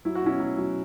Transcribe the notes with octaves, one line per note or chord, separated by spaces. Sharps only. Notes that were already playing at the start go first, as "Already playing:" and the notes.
F#3 E4
F#4
B2 C#4 E4
F#3
F#3